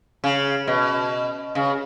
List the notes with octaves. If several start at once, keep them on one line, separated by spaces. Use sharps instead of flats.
C#3
B2
C#3